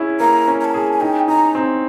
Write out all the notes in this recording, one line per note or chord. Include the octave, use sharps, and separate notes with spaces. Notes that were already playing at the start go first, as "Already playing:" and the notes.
Already playing: C#4 E4 G#4
A#3 A#5
C#4
A#5
A5
G#4
G#5
D#4 G5
D#4 A#5
C4